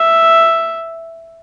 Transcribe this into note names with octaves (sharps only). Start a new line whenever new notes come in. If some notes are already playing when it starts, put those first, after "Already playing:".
Already playing: E5